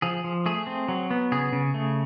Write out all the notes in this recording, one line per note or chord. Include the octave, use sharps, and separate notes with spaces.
F3 G#4
F3
A3 G#4
C4
F#3
B3
C#3 G#4
C#3
A3